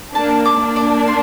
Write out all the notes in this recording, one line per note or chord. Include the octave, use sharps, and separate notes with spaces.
A#3 D4 A5
D6
A#3 D4
D5
C6